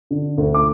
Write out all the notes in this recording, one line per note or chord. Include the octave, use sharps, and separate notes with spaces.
D3
D2
D6